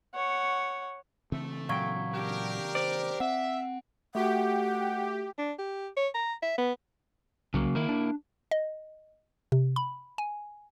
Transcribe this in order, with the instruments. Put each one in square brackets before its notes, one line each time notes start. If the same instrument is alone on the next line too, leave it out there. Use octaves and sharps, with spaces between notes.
[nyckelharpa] C#5 F#5
[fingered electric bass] C#3 E3 C4 [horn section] A3
[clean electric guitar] A#2 F#3 G5 [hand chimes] F5 C#6 G#6
[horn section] D4 G4 A#4
[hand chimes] C5 [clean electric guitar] D5
[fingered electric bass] C4 [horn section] E5 [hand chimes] F#5
[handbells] A3 F#4 [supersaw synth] G4 [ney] F#5
[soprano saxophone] D4
G4
C#5
A#5
E5
B3
[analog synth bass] C2 [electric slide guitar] C#3 F#3 A#3
[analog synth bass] D#3 [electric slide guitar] A#3 E4
[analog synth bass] D4
[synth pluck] D#5
C3
B5
G#5